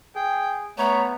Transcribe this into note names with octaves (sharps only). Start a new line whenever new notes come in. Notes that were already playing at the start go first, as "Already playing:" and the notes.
G#4 G5
A3 B3 C#5 A#5